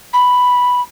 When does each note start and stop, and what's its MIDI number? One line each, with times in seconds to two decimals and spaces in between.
0.13 0.81 83